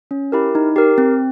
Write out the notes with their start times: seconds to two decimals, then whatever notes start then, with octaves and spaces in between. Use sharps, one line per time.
0.11 C#4
0.32 E4 G4 A#4
0.55 D#4
0.76 G4 A#4
0.98 C4